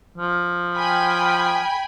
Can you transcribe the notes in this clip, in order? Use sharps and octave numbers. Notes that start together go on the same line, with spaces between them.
F3
G5 G#5 B5